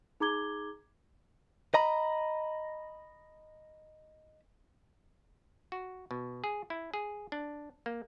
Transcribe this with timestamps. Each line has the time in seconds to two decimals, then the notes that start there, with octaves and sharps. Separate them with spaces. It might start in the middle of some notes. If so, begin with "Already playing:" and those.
0.20 D#4 G#4 A#5 D6 G#6 G7
1.74 D#5 A#5 B5
5.72 F#4
6.11 B2
6.44 G#4
6.70 E4
6.94 G#4
7.32 D4
7.86 A#3